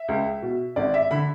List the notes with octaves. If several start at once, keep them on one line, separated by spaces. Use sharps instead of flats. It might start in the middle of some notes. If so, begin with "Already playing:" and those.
Already playing: E5
C#2
B2
G#1 D5
E5
D3 B5